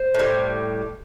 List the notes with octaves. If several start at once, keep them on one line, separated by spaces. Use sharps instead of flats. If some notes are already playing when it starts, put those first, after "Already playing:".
Already playing: C5
A2 G3